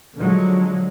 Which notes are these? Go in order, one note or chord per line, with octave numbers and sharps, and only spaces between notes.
D3 F3 F#3 G#3